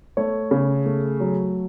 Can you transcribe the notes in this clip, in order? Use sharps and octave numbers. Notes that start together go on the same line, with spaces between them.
A3 C#5
C#3
A3
F#3